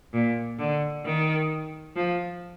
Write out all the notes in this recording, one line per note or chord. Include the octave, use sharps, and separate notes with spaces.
A#2
D3
D#3
F3